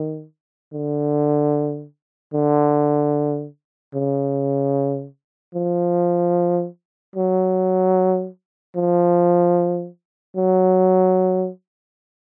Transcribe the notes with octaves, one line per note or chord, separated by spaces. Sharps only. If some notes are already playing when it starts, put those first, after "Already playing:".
Already playing: D#3
D3
D3
C#3
F3
F#3
F3
F#3